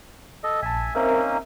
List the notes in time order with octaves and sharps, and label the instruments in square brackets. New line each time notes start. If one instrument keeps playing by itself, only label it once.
[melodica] A4 D#5
[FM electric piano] A#1 A5 [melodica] E5 G#5
[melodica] A#3 C#4 D#4 [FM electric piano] C4 A#4 E5